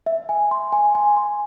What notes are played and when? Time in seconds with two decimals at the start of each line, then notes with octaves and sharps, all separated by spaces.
0.06 E5
0.29 G#5
0.51 C6
0.73 G#5
0.95 G#5
1.17 C6